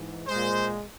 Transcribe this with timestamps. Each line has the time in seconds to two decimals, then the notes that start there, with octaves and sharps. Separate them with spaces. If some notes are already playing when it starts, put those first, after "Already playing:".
Already playing: G#2 E3
0.27 A#2 G#3 C5